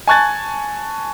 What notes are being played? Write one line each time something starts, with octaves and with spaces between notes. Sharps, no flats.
G#5 A5 C#6 F#6 G#6 A6